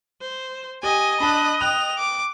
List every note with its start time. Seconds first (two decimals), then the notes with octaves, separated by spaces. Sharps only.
0.21 C5
0.83 G4 D#5 G#5
1.20 D4 A5 B5 F#6
1.61 G5 D#6 F#6 F7
1.98 D6